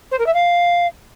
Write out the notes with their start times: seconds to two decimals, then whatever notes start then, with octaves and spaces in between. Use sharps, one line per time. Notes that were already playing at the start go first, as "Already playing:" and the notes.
0.11 C5
0.19 A#4
0.26 E5
0.34 F5